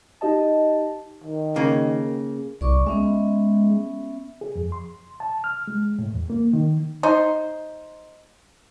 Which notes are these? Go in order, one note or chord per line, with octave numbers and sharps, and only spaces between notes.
D#4 G4 D#5 A5
D#3
C#3 A#3
C2 D5 C#6 D6
G#3 B3 C#4 E5
G#4
F2
C6
A5
F6
G#3
A2
E2
A#3
D#3
D#4 C5